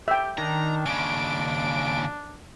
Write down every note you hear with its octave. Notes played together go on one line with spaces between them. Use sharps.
G4 E5 G5
D#3 D4 A#5
D#2 C#3 D7